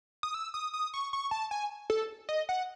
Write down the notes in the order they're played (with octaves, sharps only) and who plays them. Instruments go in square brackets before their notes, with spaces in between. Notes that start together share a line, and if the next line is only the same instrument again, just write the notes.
[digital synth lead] D#6
E6
D#6
D#6
C#6
C#6
A5
G#5
A4
D#5
F#5